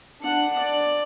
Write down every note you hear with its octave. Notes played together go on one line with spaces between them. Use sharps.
D4 F#5
D5